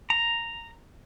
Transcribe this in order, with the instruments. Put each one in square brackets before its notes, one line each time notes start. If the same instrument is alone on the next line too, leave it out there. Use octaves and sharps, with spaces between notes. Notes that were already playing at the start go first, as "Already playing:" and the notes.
[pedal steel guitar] A#5